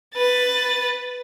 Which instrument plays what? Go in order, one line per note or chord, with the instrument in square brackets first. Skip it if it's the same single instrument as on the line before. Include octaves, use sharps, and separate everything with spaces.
[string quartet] B4 A6